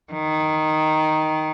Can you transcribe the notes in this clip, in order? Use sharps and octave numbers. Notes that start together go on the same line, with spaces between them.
D#3